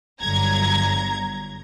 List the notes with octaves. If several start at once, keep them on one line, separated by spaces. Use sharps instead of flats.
G1 F#3 A#5 G#6